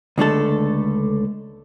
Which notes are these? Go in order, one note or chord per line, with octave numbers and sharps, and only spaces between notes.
C#2 D3 A3 A4